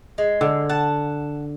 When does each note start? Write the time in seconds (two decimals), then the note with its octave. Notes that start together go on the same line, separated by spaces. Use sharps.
0.18 G#3
0.41 D3
0.69 F#5 A5